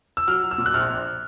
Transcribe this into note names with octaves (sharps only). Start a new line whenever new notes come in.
E6
F#3 F6
F#3
E6
A#2
F#6
A#1 F6
A#1